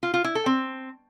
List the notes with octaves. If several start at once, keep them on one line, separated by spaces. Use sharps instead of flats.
F4
F4
E4
A4
C4